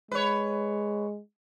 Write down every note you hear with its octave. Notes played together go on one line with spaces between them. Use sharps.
G#3 B4 C#5